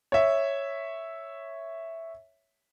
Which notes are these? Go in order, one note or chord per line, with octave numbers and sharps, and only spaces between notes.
C#5 E5